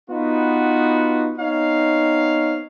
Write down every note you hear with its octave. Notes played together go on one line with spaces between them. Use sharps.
B3 D#4 F4 F#4 B4
B3 C4 D#4 C#5 F5